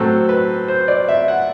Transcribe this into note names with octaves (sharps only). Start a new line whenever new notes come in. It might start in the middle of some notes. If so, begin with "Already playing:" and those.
Already playing: A2 F#3 C4 A4
B4
C5
D5
E5
F#5